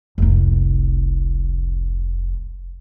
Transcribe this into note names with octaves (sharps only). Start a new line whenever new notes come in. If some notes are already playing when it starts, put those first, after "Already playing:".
F1 C2